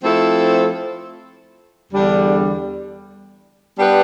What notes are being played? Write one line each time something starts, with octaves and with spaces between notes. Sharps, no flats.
F3 A3 C4 E4 A4
E2 D3 G3 D4
G3 B3 D4 G4 B4